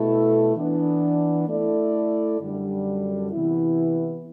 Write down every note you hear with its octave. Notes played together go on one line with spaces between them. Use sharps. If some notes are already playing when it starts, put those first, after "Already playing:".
Already playing: B2 A3 E4 A4
E3 B3 D4
A3 E4 A4 D5
F#2 D3 G3 D4
C3 E3 B3 E4